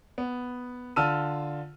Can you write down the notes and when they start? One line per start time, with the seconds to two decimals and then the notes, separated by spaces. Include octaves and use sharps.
0.18 B3
0.96 D3 F4 A5 E6 F6 D#7